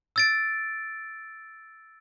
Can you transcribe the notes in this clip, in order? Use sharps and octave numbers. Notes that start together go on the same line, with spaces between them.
E6 A6 D7